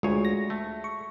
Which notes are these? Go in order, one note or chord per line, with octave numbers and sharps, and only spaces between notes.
D2 G#3 F4 G#4 C#5
A#6
A3
C#6